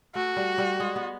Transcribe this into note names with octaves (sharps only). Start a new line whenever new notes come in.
A3 F#4
G3
G3
G#3
B3